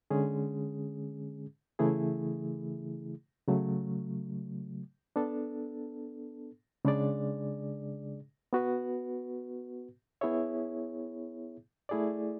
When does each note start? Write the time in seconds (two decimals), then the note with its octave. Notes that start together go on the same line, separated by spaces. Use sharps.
0.10 D3 G#3 C#4 G#4
1.79 C#3 E3 A3 E4 G#4
3.48 C#3 F#3 A3
5.16 B3 D4 A4
6.85 C#3 G#3 D4 G#4 D5
8.53 B3 F#4 B4
10.21 B3 E4 G#4 C#5 E5
11.89 A3 E4 G#4 D5